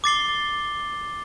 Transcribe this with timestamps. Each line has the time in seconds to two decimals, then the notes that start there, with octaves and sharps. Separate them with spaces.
0.04 D6 A6 C7 G7